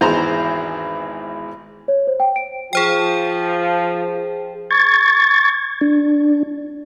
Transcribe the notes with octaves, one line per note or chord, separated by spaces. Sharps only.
G#1 E2 G#3 C5 A#5 C6
C#5
C5
G5
D7
F3 G#4 C5 G5
C#6 G#6 A6
D4